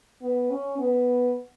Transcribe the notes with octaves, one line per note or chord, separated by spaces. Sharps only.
B3
C#4
B3